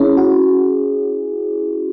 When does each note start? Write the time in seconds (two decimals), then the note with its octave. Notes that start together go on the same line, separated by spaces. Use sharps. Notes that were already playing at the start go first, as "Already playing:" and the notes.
Already playing: C#4 E4 G#4
0.17 F#4